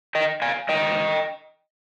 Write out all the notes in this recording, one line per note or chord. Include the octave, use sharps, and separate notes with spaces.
D#5 G5
F5 G#5
G#2 G3 D#5 G5